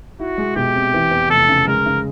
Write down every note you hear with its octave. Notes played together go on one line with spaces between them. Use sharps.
E4 F#4
G#3
B2 G4
C4
E3
E2
F1 A4
C#3
G#3 A#4
C#3